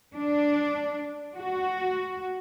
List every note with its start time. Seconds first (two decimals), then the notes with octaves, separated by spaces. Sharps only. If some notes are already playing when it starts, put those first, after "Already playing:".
0.14 D4
1.36 F#4